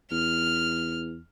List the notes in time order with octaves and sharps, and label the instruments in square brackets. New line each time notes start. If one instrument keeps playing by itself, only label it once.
[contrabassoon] E2 [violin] F6